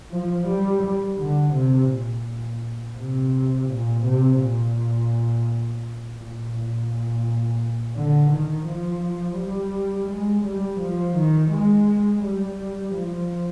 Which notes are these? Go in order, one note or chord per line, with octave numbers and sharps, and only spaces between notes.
F3
G3
D3
C3
A#2
C3
A#2
C3
A#2
A#2
A#2
D3
D#3
F3
G3
G#3
G3
F3
D#3
G#3
G3
F3